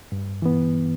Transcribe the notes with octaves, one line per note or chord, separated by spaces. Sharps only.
G2
E3 B3